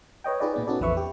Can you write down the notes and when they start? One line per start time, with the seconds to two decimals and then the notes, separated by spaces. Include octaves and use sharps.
0.24 B4 C#5 D#5 G5
0.40 D#4 F4 G#4 B4 D5 D#5
0.54 A#2 B3 D5
0.67 B3 C#4 D#4 F#4 A4 D5
0.80 A1 E2 F3 B4 E5 C#6
0.97 G4